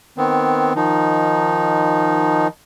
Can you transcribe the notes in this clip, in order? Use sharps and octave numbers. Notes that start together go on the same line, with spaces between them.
D#3 B3 C4
D#3 F3 D#4